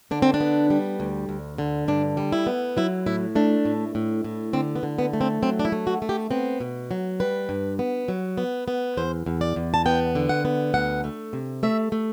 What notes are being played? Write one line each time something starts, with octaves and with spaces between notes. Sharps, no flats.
D3 D4
C4
D4
B3
G3
D2
D2
D3
G2 D4
G3
E4
B3
F#3 E4
A2 E4
A3 D4
A2
A2
A2
D3 C4
B3
D3
B3
A3
C4
F#3 C4
D4
E4
A3
F#4
A3
G4
B3 C4
B2
F#3
G3 B4
G2
B3
F#3
B3
B3
E2 C5
E2
D5
E2
A5
B3 G5
D3
F#5
B3
D2 F#5
A3
C3
A3 E5
A3